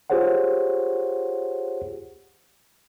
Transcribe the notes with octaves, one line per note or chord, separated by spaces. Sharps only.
F4 G4 G#4 C5 C#5 F#5